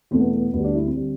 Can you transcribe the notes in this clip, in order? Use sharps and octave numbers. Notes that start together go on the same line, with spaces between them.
E2 B2 A3 C4
B3
B3
D2 D3 G3 B3
D4
E4
C4
D3 G3